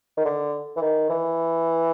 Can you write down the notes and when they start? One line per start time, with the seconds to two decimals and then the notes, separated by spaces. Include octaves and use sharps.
0.17 D#3
0.25 D3
0.76 E3
0.81 D#3
1.09 E3